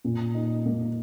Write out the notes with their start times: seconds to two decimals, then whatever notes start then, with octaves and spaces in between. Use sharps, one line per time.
0.04 A#2
0.34 D#4
0.66 A#3